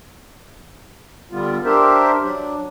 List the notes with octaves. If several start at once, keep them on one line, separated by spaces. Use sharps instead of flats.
D3 G3 B3 F4
D4 G4 A#4 C5 E5
F#3 D4